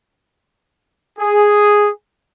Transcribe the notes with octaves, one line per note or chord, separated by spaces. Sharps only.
G#4